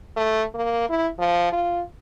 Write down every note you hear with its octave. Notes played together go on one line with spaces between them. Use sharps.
A3
A#3
E4
F3
F4